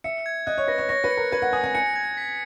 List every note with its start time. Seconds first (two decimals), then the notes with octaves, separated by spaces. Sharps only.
0.04 E5 C#7
0.26 G#6
0.47 D#5 F#6
0.58 C#5
0.68 B4 A#6
0.78 C#5
0.89 C#5 A#6
1.04 B4
1.11 C#7
1.17 A#4
1.32 B4 G#6
1.42 F#5
1.53 G#5 D#6
1.64 G#5
1.75 G#5 C#7
1.96 G#6
2.17 B6